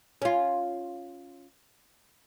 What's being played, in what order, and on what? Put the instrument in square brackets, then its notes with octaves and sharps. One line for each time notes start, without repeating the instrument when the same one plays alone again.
[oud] C#4 F4